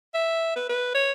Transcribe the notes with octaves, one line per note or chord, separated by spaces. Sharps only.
E5
B4
B4
C#5